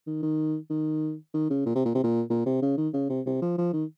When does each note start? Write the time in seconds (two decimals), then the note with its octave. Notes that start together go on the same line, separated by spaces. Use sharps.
0.07 D#3
0.23 D#3
0.70 D#3
1.34 D#3
1.50 C#3
1.66 A#2
1.75 C3
1.85 A#2
1.95 C3
2.04 A#2
2.30 A#2
2.46 C3
2.62 C#3
2.77 D#3
2.94 C#3
3.10 C3
3.26 C3
3.42 F3
3.58 F3
3.73 D#3